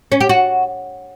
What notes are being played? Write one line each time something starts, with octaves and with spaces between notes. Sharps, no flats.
C#4
G4
F#4